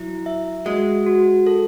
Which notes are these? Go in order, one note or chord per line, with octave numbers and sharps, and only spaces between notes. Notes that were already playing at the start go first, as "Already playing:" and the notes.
Already playing: F#3 E4
E5
G#3 F#4
F#4
A4